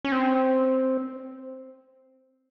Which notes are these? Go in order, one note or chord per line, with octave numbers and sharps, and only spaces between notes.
C#4
C4